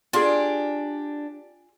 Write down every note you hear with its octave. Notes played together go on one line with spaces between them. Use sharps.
D4 F4 G4 G#4